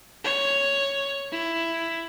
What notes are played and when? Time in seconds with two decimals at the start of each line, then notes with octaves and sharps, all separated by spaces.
0.24 C#5
1.32 E4